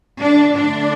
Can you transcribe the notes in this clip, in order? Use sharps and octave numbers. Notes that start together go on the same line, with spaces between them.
D3 A3 D4
D4